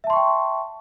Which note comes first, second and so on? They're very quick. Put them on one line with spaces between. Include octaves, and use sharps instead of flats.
E5 A5 C6 C#6 G5